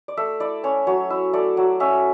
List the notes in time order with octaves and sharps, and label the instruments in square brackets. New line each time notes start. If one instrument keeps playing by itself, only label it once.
[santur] D5
A3 E5
E4 D5
C#4 C#5
F#3 C#5
E4 E5
A3 D5
F#3
C#4 E5